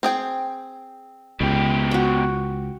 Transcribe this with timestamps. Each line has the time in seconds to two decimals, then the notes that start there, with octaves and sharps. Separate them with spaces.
0.03 C4 G#4 G5
1.41 C#2 B2 G4
1.91 F#4 G5